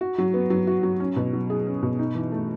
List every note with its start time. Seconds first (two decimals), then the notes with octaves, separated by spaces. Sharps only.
0.01 F#4
0.18 F#3
0.34 B3
0.50 F#3
0.67 F#4
0.83 F#3
1.00 C#4
1.16 B2
1.33 F#3
1.50 G#4
1.66 C#4
1.82 B2
1.99 D#4
2.15 E3
2.32 A3